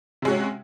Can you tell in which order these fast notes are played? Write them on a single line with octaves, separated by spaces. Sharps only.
C3 G#3 F#4 C#4